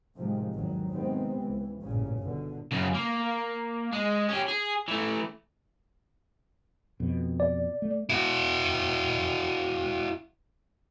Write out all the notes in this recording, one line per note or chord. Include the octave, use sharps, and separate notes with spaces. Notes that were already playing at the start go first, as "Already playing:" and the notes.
A2 C3 D#3 F3 F#3 G#3
G#1 E2 D#3 F#3
C3 D#3 G#3 B3 C4
C#2 E3
A1 G2 A#2 C#3 C#4
G1 B2 D3
F#2 C#3
A#3
G#3
C#4 G4
G#4
E3 A3
F2 B2
D5
A3
E4 F#4